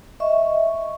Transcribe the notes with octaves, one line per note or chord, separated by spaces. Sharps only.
D#5 E5 C#6